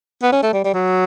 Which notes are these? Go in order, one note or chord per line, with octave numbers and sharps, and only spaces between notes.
B3
C#4
A3
G3
G3
F#3